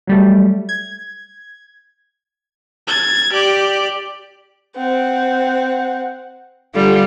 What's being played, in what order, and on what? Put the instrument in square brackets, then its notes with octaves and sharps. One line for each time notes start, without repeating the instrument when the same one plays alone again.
[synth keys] F#3 G3 A3
G#6
[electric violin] G#6 A6
G4 D5
[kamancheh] C4 F#5
[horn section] D3 [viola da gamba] G3 [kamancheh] F4